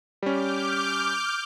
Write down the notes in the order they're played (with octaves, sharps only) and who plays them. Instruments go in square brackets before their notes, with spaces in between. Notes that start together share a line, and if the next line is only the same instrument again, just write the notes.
[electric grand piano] G3 C#4 [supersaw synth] D6 F6 G6